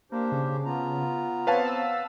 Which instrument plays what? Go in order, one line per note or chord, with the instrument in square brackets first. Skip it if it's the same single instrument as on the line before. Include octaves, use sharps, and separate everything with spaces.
[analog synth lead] A#3 [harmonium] D4 G4 C5
[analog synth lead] C#3
[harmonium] B3 F4 A#5
[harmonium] B3 C4 [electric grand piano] B4 F5 A5 [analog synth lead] C#5
[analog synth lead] E6